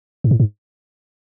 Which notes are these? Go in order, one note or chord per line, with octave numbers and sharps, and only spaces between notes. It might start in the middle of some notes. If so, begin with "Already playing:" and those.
G#2
A2
G#2